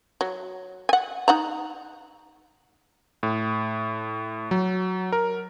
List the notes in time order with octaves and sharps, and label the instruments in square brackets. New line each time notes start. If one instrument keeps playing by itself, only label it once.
[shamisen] F#3
F#5 G#5
D#4 F#5 A#5
[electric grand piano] A2
F#3
A#4